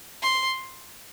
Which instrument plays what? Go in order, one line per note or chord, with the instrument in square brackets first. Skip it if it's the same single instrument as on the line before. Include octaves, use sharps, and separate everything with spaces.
[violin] C6